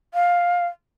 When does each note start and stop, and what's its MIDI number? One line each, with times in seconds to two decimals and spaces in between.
0.14 0.66 77